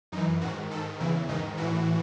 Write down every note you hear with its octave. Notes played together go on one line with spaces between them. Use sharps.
F#2 D#4
E3
G#2 D#3 F#4
G#2 D#3 A4
E2 C#3 E3 E4
G#2 D#3 D#4
A2 E3 F#4